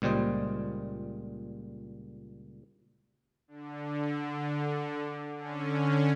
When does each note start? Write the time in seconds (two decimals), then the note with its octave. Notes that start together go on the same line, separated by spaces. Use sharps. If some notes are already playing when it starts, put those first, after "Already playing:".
0.02 C#2 A#2 G3 C5 D#5
3.48 D3
5.37 D3 C#4